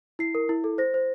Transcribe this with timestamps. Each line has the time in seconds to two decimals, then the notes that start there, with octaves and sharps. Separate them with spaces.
0.19 E4 C7
0.35 A#4
0.49 E4
0.64 A4
0.78 C5 A#6
0.94 C5